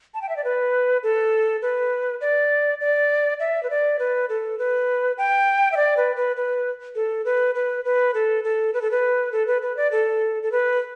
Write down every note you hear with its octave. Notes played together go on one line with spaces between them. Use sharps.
A5
G5
E5
D5
B4
A4
B4
D5
D5
E5
B4
D5
B4
A4
B4
G5
E5
D5
B4
B4
B4
A4
B4
B4
B4
A4
A4
B4
A4
B4
A4
B4
B4
D5
A4
A4
B4